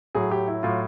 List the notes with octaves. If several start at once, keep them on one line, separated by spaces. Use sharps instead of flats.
A2 F#3 G#4
G4
E4
A2 F#3 F4